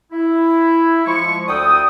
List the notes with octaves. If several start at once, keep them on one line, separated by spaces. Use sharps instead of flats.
E4
F3 G#3 C#6
D2 A4 D5 G5 D#6